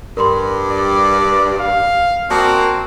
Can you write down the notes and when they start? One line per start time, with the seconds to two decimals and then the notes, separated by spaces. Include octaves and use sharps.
0.17 G2 A#4 B5 C6
0.70 D5
1.60 F5
2.30 A#3 C4 F#4 D5 A5 D#6